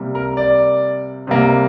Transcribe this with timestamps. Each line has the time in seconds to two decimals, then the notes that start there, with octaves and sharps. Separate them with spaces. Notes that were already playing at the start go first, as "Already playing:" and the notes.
Already playing: C3 G3 A#3
0.15 A#4
0.37 D5
1.27 C3 G3 A#3